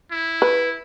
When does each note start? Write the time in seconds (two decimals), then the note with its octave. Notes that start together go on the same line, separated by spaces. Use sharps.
0.12 E4
0.42 B4